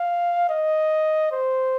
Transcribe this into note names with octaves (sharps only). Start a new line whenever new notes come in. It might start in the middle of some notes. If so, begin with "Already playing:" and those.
Already playing: F5
D#5
C5